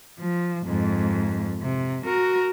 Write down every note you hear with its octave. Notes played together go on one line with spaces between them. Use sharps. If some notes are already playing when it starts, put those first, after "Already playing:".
F3
F2 G#2
C3
F#4 A#4